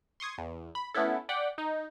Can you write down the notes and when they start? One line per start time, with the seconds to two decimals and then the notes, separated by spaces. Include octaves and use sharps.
0.20 C6 C#6 D#6 G#6
0.38 E2
0.75 B5
0.94 A3 B3 C#4 E4 A4
1.29 D5 F#5 G5 B6
1.58 D#4